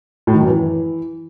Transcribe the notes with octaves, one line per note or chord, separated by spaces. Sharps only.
A2
D#3
F#2
E3